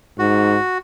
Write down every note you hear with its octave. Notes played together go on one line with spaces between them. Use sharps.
G#2 F#4